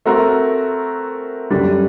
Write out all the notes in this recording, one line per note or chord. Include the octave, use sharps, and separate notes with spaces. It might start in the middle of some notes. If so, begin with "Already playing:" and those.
A3 C4 F#4 A#4
F#2 D3 G3 D4